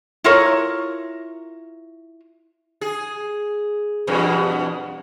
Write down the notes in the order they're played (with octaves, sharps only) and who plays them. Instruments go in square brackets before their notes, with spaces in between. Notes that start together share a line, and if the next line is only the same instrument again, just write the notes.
[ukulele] E4 F4 A#4 C#5
[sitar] G#4
E2 G2 B2